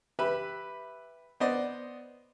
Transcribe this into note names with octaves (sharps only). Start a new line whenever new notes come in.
G4 B4 E5 B5
B3 C5 D5 D#5